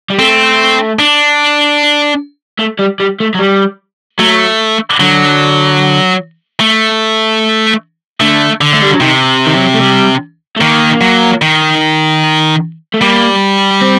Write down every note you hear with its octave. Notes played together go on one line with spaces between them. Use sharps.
G3
A3 C4
D4
A3
G3
G3
A3
F#3
G3
F#3 A3
D3 F#3
A3
D3 A3
D3
A3
G3
F#3
C3 D#3
D#3
F#3
A3
G3
A3
D#3 A#3
F#3
D#3
A3
G3 A#3
C4